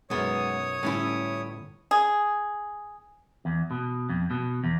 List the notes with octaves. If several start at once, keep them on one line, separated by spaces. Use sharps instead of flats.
B1 F#2 G#3 B3 C#5 D#6
G1 A2 G3 C#4 E4
G#4
E2
B2
F2
B2
E2